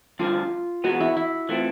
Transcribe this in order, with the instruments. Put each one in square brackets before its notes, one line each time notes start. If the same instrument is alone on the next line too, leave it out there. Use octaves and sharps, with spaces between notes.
[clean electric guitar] G2 D3 F3 [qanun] F4
[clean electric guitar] E2 B2 G#3 B3 [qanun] F#4
[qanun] E4
E4
[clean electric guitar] E3 A3 C4 [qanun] F4